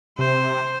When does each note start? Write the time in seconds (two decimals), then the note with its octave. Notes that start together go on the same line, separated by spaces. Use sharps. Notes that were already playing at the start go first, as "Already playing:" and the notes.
0.19 C3 C5